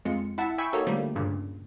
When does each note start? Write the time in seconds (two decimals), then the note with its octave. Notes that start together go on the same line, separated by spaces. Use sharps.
0.05 F2 G#3 F4 C#7
0.38 E4 E5 F#5 A5
0.58 E5 G5 G#5 B5 C#6 E6
0.73 A#3 D#4 F#4 A4 C#5
0.87 D3 F3 G3 A3 A#3
1.16 D2 G2 A#2 C#3